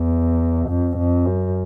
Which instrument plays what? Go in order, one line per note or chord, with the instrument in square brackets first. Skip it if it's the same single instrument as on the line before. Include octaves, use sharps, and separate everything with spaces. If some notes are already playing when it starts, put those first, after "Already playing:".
Already playing: [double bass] E2
F2
F2
F#2